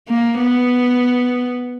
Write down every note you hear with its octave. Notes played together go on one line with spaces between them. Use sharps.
A#3
B3